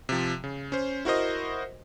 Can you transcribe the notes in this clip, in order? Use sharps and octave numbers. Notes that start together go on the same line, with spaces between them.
C3 F3
C#3
C#4 C5
E4 F#4 A#4 C5 D#5